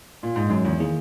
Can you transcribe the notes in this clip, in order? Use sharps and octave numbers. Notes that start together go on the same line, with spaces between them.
A#2
G#2
F#2 E3 G#3 D#4
E2
D#3 A#3 E4 G#4